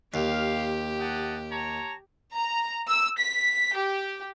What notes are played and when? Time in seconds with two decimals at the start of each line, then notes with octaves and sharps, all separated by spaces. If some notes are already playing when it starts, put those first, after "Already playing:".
0.14 D#2 G4 F5
0.99 D#5 F#5 A5
1.51 C#5 A5 A#5
2.35 A#5
2.88 E6
3.19 B6
3.76 G4